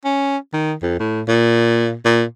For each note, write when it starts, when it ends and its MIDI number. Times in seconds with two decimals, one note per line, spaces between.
0.05 0.37 61
0.53 0.74 51
0.82 0.99 41
1.00 1.22 45
1.28 1.95 46
2.05 2.24 46